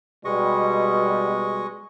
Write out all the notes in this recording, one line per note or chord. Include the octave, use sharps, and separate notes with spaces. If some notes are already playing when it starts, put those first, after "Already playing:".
B2 G3 G#3 D#5 C#6